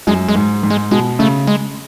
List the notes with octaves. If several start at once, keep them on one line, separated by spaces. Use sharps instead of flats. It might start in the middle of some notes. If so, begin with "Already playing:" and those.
F#2 G#3
G#3
G#2
G#2
G#3
B2 G#3
C#3 A3
G#3